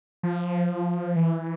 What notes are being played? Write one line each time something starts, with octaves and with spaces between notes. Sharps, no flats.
F3
E3